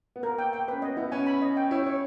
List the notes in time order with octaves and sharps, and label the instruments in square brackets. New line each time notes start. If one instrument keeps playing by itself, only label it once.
[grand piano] B3
[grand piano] A#3 [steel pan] A#4
[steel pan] G5
G5
[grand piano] C#4 [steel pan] B4
[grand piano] B3 [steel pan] D#5
[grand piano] B3 [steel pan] E4
[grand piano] C#4 [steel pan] G#5
[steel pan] B5
D#5
G5
[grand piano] E4 [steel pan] C#5
[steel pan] C#5